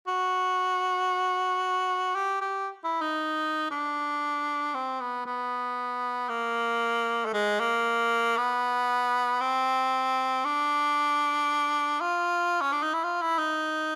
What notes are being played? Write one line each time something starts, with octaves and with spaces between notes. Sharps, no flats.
F#4
G4
G4
E4
D#4
D4
C4
B3
B3
A#3
A3
G#3
A#3
B3
C4
D4
F4
C#4
D4
D#4
E4
F4
E4
D#4